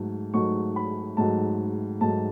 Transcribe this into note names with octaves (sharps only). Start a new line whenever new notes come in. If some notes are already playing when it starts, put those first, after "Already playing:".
Already playing: G#2 F#3 A3
G#2 F#3 A3 C#6
B5
G#2 F#3 A3 A5
G#2 F#3 A3 A5